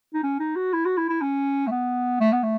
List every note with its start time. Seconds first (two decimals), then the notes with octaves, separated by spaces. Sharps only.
0.14 D#4
0.23 C#4
0.40 D#4
0.56 F#4
0.73 E4
0.85 F#4
0.97 E4
1.09 E4
1.22 C#4
1.67 A3
1.71 B3
2.20 A3
2.32 B3
2.43 A3